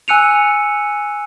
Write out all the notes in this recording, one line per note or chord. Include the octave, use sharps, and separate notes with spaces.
G#5 E6 F#6 C#7 D#7 F7